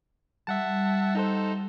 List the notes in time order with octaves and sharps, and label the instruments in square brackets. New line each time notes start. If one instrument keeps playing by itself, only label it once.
[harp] G3 [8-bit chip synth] E5 F#5 A5
[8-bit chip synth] D#4 A4 C5